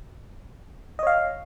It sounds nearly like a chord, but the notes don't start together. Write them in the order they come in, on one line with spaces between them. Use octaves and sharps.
D#5 C#5 F5